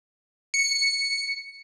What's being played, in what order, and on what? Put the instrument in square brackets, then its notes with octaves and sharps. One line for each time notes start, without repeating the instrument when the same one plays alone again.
[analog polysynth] C#7